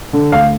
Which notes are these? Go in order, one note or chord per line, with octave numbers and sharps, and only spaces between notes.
D3
D2 F5